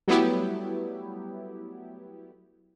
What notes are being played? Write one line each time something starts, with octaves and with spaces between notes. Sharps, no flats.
F#3 G3 A3 B3 E4 G4